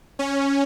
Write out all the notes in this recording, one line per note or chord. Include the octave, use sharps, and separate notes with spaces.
C#4